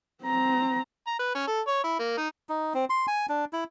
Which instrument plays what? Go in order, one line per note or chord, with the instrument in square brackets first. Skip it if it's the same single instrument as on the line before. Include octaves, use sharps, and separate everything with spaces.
[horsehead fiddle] C4 A#5
[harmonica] A#5
B4
C#4
A4
C#5
E4
A#3
D#4
[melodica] D#4
C4
C6
G#5
D4
E4